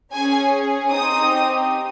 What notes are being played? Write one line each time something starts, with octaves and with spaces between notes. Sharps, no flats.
C#4 G#4 G#5
C4 D#4 G4 D#6